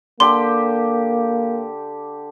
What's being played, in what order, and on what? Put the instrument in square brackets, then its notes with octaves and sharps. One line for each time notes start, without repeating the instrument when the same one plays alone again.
[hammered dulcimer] D3 G4 [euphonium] A#3 [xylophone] C6